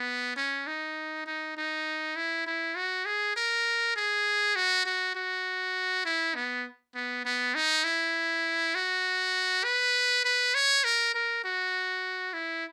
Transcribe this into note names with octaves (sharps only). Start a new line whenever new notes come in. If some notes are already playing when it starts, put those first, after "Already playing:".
Already playing: B3
C#4
D#4
D#4
D#4
E4
E4
F#4
G#4
A#4
G#4
F#4
F#4
F#4
E4
B3
B3
B3
D#4
E4
F#4
B4
B4
C#5
A#4
A#4
F#4
E4